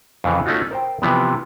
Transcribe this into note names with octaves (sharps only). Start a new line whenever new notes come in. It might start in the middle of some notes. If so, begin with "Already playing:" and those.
F2 C#3 E3
A3 C#4 D#4 F4 F#4
A#4 C5 G5
C3 E3 F3 B3